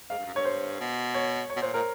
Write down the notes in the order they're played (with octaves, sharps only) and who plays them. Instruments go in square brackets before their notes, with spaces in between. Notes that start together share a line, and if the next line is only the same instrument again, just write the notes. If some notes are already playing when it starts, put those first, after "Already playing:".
[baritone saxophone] G#2 [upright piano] F5
[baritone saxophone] G2
F#2
[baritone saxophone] G2 [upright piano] C#5
[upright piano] C5
[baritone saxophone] B2
[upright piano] C#5
C#5
[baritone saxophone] B2
[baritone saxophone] A#2 [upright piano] C5
[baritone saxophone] A#2 [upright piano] A#4